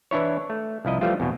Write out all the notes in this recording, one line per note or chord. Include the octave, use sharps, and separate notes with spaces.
E3 D4 E4 C#5
A3
C2 F3 E4 D#5
E3 F3 G3 A3 F4
E2 B2